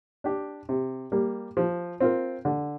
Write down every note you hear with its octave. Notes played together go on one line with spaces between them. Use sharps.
D4 G4
C3
G3 A#3
F3
C4 F4 A#4
D3